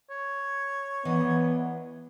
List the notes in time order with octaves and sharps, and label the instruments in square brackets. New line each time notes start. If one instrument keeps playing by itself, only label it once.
[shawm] C#5
[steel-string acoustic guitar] E3 D4 D#5 [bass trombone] B3